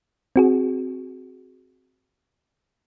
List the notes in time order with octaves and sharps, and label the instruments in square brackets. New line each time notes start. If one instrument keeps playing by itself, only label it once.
[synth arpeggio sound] C4 F#4 G#4